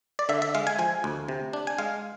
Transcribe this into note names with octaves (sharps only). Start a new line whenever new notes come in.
D5
D3 E5
E5
G#3 F5
G#5
F3 G#5
D2
C3
D4
G#5
G#3 F5